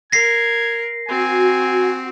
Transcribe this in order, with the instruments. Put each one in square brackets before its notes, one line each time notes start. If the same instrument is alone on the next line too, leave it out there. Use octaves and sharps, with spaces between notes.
[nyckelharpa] A#4 [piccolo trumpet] G#6 [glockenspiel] A#6 C7
[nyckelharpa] C4 [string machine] F#4 [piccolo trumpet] G#5